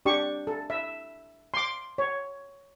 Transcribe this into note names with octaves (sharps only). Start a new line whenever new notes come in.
D4 G4 C#6
A4
E5
C6 D6
C#5